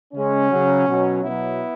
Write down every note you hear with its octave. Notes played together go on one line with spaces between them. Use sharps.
C#3 G#3 C#4
C#3 F#3
B2 F#3
B2 F#3 B3 E4